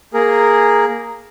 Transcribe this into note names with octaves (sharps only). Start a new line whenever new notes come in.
A#3 G#4 A#4